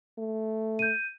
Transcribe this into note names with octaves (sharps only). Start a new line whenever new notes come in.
A3
G6 D#7